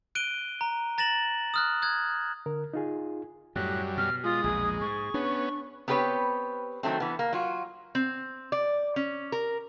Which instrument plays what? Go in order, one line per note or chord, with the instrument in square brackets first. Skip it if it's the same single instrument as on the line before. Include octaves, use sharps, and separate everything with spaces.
[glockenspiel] F#6 D7 D#7 G7
A#5
A#5 A6 A#6 E7 F#7
D#6 F6 F#6
D#6 F#6 G#6
[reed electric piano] D3 A#4
D#4 F4 G#4
[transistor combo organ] F#2 G3 [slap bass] A2 [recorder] F#6
[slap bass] B2 [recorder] F6
[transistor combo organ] G#3 [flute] F4 [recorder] D#6
[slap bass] A#1 E2 B2 [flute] G#4
[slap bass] G#2 [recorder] C#6
[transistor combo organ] B3 C#4 [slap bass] D4
[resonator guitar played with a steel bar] B3 C4 G4 A#4 B4 C#5
D#3 F#3 A3 C4
E3 B3
A#3
F#3 F4 F#4
C4
D5
C#4
A#4